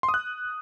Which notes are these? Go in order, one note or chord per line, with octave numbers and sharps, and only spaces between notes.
C6
D#6
F#6